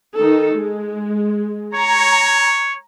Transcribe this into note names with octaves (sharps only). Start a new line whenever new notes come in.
D#3 D#4 A4
G#3
C#5 A#5